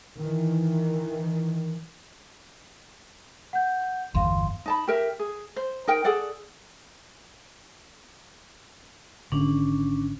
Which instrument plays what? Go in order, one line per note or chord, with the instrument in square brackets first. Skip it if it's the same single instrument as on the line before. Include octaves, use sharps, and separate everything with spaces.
[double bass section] D#3 E3
[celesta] F#5 G6
[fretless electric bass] G1 E2 [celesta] F5 C6
[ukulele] D#4 A5 B5
G4 A#4 E5
G#4
C5
D#4 A#4 G5
G#4 A4 D5 F#5
[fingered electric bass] G#1 D3 [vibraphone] C#4 D4